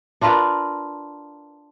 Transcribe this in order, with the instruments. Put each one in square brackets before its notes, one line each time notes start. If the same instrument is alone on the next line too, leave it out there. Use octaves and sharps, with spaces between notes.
[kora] D4 F4 A#4 B4